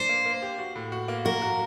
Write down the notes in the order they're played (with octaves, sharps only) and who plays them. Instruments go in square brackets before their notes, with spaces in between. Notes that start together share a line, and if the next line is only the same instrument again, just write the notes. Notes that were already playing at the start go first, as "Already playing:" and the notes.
Already playing: [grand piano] D4 [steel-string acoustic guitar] C5
[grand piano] A#3
A#3
G4
F#4
A2
F#4
A#3
[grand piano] F#4 [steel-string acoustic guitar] A#4
[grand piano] F#4